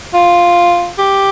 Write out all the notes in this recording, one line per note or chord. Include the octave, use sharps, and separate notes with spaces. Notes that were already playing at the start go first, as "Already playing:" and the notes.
F4
G4